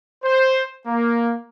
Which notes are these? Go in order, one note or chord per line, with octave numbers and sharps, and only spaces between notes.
C5
A#3